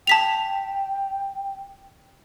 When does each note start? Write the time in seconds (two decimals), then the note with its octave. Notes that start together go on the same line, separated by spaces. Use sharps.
0.07 G5 A5 B6 F7